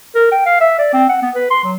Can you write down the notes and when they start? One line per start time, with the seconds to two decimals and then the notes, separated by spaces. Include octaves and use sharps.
0.15 A#4
0.32 G5
0.46 F5
0.61 E5
0.79 D5
0.93 C4
1.09 F#5
1.22 B3
1.35 B4
1.51 C6
1.64 F#3